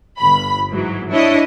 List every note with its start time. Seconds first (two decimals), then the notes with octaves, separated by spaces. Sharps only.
0.18 G1 B5
0.71 G#2 E3 F#3
1.10 D4 E4 C#5 D#5